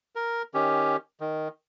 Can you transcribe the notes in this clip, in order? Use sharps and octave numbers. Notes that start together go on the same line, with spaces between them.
A#4
D#3 C#4 G4
D#3